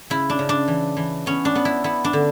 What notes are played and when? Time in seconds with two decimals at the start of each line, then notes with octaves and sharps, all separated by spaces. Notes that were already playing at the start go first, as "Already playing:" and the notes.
0.10 C#3 E4
0.30 D4
0.39 C#3
0.49 D4
0.68 E3
0.97 E3
1.26 B3 C#4
1.45 D4
1.55 B3
1.65 E4
1.84 B3 E4
2.05 D4
2.13 D3